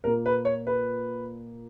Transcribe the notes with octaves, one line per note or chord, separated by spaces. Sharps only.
A#2 A#3 A#4
B4
C#5
B4